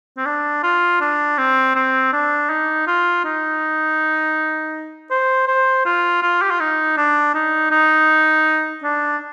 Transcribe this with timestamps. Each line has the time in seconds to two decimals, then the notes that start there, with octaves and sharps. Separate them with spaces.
0.17 C4
0.26 D4
0.63 F4
1.01 D4
1.38 C4
1.75 C4
2.13 D4
2.50 D#4
2.87 F4
3.25 D#4
5.11 C5
5.48 C5
5.85 F4
6.22 F4
6.42 G4
6.51 F4
6.60 D#4
6.97 D4
7.35 D#4
7.71 D#4
8.83 D4